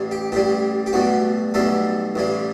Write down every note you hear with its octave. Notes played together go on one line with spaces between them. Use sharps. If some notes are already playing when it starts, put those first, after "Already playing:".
Already playing: A1 A2 G3
G4
A1 A2 G3 G4
G4
B1 A2 G3 F#4
B1 A2 G3 A4
A1 A2 G3